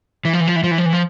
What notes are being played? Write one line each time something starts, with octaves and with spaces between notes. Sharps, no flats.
E3
F3
E3
F3
E3
F3
E3
F3
E3
F3